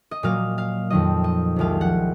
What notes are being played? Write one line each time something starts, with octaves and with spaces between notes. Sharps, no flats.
D#5
A#2 F#3 A#3 F5
F5
F2 D#3 F#3 D#5
D#5
C2 C3 F3 G#3 F5
F#5